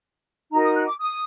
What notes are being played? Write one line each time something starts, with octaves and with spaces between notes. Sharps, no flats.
D#4 F#4 A#4 A#5
D#6
F#6
D6
D#6